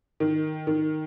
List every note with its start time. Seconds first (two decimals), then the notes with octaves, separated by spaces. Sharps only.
0.20 D#3
0.67 D#3